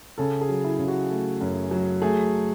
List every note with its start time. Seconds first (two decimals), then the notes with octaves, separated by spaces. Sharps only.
0.18 C#3 A4
0.41 G#4
0.49 F#3
0.65 E4
0.79 C#3
0.88 F#4
1.10 A3
1.41 F#2
1.71 F#3
2.02 A3 G#4